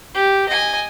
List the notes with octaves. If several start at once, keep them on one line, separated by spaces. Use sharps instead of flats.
G4
D#5 G#5